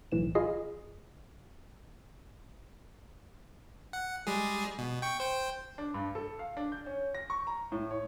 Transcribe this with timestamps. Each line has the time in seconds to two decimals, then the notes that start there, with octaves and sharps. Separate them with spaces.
0.12 B1 A2 E3 E7
0.35 F4 G#4 D#5 B5 C7
3.93 F#5
4.27 G3 G#3 G#4
4.79 B2
5.02 G5 C#6
5.20 C5 G5
5.78 D4
5.94 G2
6.15 A4
6.39 F5
6.57 D4
6.72 G6
6.86 C#4
7.15 A#6
7.30 C#6
7.47 A#5
7.72 A2
7.91 C#5